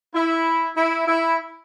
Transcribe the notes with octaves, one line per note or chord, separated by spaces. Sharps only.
E4
E4
E4